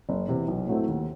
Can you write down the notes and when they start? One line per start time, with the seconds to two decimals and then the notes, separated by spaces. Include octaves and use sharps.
0.09 F#1
0.28 E2 C3
0.48 B1
0.67 A2 F#3 A3 C4
0.88 D#2